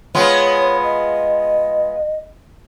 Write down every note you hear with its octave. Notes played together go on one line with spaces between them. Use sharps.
G#3 B3 F4 C#5
D#5